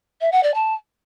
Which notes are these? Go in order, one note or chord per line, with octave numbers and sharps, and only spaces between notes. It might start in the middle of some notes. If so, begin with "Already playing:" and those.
E5
F#5
D5
A5